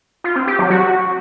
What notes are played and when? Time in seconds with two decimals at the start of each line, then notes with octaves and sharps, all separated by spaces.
0.24 F4
0.36 C4
0.47 G4
0.59 F#3
0.70 F#4